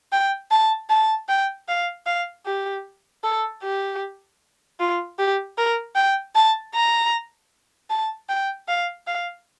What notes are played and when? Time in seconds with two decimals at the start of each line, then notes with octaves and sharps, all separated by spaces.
0.12 G5
0.51 A5
0.90 A5
1.29 G5
1.68 F5
2.06 F5
2.46 G4
3.23 A4
3.63 G4
4.80 F4
5.19 G4
5.58 A#4
5.95 G5
6.35 A5
6.74 A#5
7.90 A5
8.29 G5
8.68 F5
9.07 F5